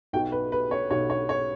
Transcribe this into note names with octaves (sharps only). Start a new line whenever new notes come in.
B1 B2 G5
B4
B4
C#5
B1 B2 C#5
C#5
C#5